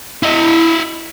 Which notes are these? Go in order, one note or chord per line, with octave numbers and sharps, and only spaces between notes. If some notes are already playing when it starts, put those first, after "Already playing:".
E4 D#5